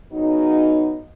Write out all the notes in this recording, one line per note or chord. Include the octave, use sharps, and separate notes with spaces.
C#3 F#3 B3 D#4